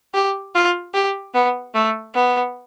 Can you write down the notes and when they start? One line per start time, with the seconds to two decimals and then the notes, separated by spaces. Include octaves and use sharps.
0.14 G4
0.55 F4
0.94 G4
1.34 B3
1.74 A3
2.14 B3